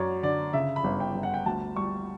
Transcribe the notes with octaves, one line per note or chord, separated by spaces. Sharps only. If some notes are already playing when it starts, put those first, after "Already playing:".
Already playing: F#2 F#3 C#5 D5
D3 D5
C#3 E5
B5
G1
G5
G1
F#5
G5
D2 A5
G3 C#6